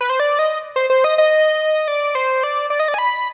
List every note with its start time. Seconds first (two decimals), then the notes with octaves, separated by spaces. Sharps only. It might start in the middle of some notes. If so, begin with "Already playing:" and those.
0.01 B4
0.10 C5
0.20 D5
0.39 D#5
0.76 C5
0.90 C5
1.04 D#5
1.18 D#5
1.88 D5
2.15 C5
2.43 D5
2.70 D5
2.79 D#5
2.88 D5
2.94 G#5
2.98 B5